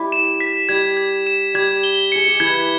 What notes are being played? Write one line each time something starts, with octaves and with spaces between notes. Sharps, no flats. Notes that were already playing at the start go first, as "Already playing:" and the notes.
Already playing: G3 E4 G4
E7
B6
G3 G4 G#6
G#6
E7
G3 G4 G#6
G7
G#4 C#7
G4
E3 E4 G#6